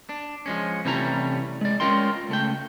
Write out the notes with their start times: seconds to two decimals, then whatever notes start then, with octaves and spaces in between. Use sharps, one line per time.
0.09 D4
0.46 F3 G#3 C#4
0.85 C3 E3 G3 A3 C#4 A#5
1.61 G#3 D5
1.80 G#3 C#4 F4 A#4 G5 C6
2.29 C#2 A3 G5